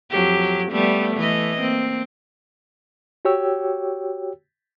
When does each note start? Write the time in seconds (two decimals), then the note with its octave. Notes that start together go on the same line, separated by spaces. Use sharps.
0.10 F2 F#3 G4
0.71 G3 A3 B3
1.16 E3 A3 D#5
1.57 A#3 C4
3.25 F#4 G4 C#5 G5 E6